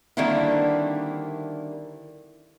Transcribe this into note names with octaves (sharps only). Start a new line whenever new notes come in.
D3 D#3 G3 A#3 C4 E4